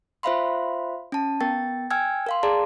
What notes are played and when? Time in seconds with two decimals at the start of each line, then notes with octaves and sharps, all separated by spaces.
0.23 F4 C5 E5 F5 B5 C6
1.12 C#4 A5
1.40 B3 A#4 G5 A6
1.90 G5 G#5 E6 F6 G#6
2.27 A#4 F5 C6
2.43 G#4 D5 A5 A#5 C6